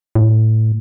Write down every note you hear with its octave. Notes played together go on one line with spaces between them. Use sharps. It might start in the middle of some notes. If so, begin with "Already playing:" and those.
A2